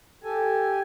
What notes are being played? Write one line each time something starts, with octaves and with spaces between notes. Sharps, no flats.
G4 A4 G#5